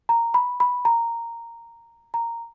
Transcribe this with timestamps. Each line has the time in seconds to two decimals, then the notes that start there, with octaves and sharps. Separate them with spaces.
0.09 A#5
0.34 B5
0.60 B5
0.85 A#5
2.14 A#5